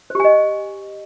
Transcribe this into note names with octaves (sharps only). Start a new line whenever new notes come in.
G4 C5 D#5 G#5